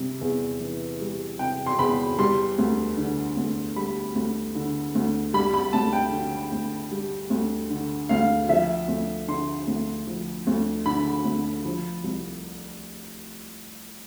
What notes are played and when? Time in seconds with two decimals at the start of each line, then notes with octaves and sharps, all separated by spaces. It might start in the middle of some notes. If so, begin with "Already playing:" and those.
Already playing: C3 G3
0.21 E2
0.60 E3
1.01 G3
1.39 C3 G5
1.66 C6
1.79 E2 B5
2.18 G3 C6
2.58 D2
2.97 D3
3.37 D2
3.76 G3 B5
4.15 D2
4.55 D3
4.95 D2
5.34 G3 B5
5.54 B5
5.73 D2 A5
5.93 G5
6.12 D3
6.52 D2
6.91 G3
7.30 D2
7.70 D3
8.09 D2 F5
8.49 F3 E5
8.88 D2
9.28 D3 C6
9.68 D2
10.07 F3
10.47 D2
10.86 D3 B5
11.25 D2
11.65 F3
12.04 C2